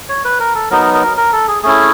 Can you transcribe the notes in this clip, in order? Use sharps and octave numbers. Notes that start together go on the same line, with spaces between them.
C#5
B4
A#4
A4
F#3 B3 D#4 A#4
A#4
A#4
A4
G#4
A3 C#4 E4 G#4